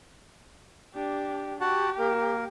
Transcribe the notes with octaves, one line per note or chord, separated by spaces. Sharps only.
D4 G4
F#4 G4 F#5 A5
A#3 A#4